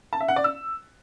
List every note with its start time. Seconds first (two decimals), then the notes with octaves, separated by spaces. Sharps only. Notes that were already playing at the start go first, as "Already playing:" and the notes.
0.13 A5
0.21 E5
0.28 F#5
0.36 D5
0.44 E6